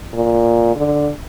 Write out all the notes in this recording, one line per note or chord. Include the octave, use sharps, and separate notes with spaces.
A#2
D3